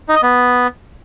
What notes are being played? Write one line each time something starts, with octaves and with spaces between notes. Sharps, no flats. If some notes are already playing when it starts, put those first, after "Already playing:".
D#4
D#5
B3